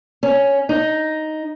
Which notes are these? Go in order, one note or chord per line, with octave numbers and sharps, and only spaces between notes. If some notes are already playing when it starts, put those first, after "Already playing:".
C#4
D#4